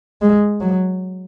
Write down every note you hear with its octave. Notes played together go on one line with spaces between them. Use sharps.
G#3
F#3